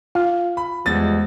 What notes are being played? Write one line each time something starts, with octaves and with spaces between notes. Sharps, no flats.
F4 F5
B5
E2 F3 G3 G#3 A6